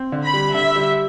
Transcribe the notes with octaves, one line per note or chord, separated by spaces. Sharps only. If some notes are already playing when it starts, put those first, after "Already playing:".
Already playing: C4
D3
B5
G3
D3 E5
G3